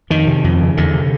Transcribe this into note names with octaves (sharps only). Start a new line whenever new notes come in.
F2 D#3
C3
F2
C#3
E2 D3
C3